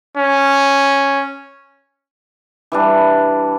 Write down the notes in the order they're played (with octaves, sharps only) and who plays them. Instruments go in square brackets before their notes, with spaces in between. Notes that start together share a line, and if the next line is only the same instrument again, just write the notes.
[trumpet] C#4
[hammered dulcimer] E3 G3 D4